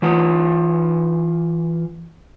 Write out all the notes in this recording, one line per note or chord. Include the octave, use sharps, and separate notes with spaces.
E3 F4 F#5